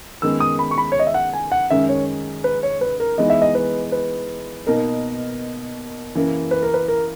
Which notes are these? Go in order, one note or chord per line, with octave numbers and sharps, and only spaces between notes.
F#2 D#3 G#3 B3 E6
D#6
B5
C#6
B5
C#5
D#5
E5
F#5
G#5
F#5
F#2 D#3 G#3 C#4 E5
C#5
B4
C#5
B4
A#4
E3 G#3 B3 D#4 D#5
E5
D#5
B4
B4
B2 A#3 D#4 A#4
F#2 C#3 E3 A#3
B4
A#4
B4
A#4